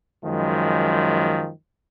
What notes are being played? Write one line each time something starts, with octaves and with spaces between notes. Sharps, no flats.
F#2 D#3 F3 G#3